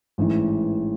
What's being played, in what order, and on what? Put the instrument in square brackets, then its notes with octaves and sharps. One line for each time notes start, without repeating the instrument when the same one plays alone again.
[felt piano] A1 G#2 E3